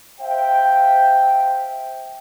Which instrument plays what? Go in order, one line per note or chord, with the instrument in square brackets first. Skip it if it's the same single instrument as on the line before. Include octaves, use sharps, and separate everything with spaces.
[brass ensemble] C5 E5 F5 G5